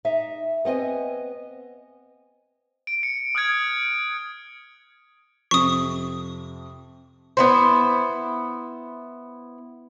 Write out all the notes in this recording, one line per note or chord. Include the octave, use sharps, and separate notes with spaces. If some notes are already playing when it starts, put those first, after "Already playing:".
D#4 E5
B3 C4 D#5 G#5
D7
C#7
D#6 F6 F#6 G#6 D7
F2 C3 F3 C#6 D#6
B3 E4 C5